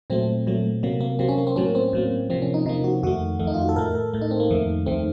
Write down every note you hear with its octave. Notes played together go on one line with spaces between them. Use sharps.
A#2 F#3 A3 C4
A#2 F#3 A3
C3 F#3 A#3
A#3
C3 F#3 A#3 C4
C#4
A#3
C4
A2 F#3 A#3 C#4
C4
A2 F#3 A#3
C3 F3 A#3 C4
C#4
D#4
C3 F3 A#3 D#4
F#4
F2 D#3 A3 F#4
F2 D#3 A3
D#4
F4
F#4
A4
A2 A3 A#4
A4
A2 A3
D#4
C4
A#3
F2 D#3 A3
F2 D#3 A3 C4